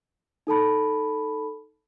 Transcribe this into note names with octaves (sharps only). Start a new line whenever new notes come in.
D#4 A4 A5 B5